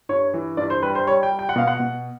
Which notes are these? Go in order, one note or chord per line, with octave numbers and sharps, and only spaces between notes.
G2 C#5
E3
G2 D5
C5
G3 B4
C5
G3 C#5
G5
G3
G5
F#5
B2 F5
F#5
B2